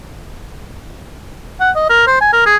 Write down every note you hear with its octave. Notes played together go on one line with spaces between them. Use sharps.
F#5
D#5
A#4
C5
G#5
A#4
G#4